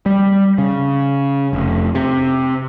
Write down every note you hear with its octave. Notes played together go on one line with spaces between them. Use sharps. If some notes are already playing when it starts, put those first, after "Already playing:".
G3
C#3
F1
C3